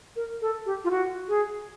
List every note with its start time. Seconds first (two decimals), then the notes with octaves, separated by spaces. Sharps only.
0.16 A#4
0.41 A4
0.66 G4
0.84 F4
0.91 F#4
1.29 G#4